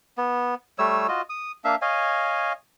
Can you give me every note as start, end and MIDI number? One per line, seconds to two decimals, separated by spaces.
0.18 0.54 59
0.79 1.07 55
0.79 1.07 57
0.79 1.07 73
0.79 1.07 88
1.08 1.22 65
1.08 1.22 66
1.08 1.22 75
1.30 1.52 87
1.64 1.75 58
1.64 1.75 62
1.64 1.75 76
1.64 1.75 77
1.82 2.53 73
1.82 2.53 75
1.82 2.53 77
1.82 2.53 80